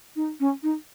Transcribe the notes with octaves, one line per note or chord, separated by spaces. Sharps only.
D#4
C#4
D#4